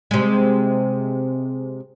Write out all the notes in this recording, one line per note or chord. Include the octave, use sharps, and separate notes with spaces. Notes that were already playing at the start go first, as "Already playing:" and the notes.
C3 G#3